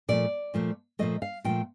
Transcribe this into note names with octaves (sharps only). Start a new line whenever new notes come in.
A#2 F3 A3 D5
A#2 F3 A3
A#2 F3 A3 D#5
F5
A#2 F3 A3 G5